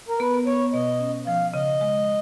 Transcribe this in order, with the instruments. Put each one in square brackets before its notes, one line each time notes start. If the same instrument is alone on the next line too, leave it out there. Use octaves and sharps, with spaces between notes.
[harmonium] A#4
[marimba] B3 [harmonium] B4
[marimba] B3 [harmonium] C#5
[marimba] B2 [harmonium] D#5
[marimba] C#4
[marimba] F3 [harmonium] F5
[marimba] C#3 [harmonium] D#5
[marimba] G#3